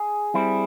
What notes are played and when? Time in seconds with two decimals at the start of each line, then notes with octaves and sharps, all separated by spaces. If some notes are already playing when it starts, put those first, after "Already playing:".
Already playing: G#4
0.34 G3 C4 E4